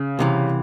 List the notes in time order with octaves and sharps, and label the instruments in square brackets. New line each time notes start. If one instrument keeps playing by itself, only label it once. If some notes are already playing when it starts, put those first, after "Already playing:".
Already playing: [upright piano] C#3
[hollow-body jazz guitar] C2 C3 E3